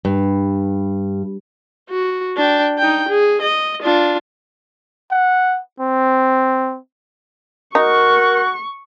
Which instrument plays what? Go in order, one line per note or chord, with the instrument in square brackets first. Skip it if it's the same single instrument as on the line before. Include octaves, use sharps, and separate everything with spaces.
[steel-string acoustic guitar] G2
[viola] F#4
D4 G5
D#4 G5
G#4
D#5
D4 F4
[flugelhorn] F#5
C4
[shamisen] D#4 [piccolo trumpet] F#4 [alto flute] A#4 [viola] C#6